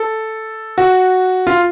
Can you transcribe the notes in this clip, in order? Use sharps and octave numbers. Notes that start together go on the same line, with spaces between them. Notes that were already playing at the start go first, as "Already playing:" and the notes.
Already playing: A4
F#4
F4